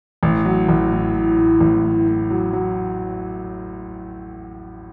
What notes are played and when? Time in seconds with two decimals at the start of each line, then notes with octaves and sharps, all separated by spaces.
0.23 A1
0.45 F#3
0.68 A1
0.92 A2
1.15 A2
1.38 A2
1.60 A1
1.85 A2
2.06 A2
2.30 F#3
2.53 F#3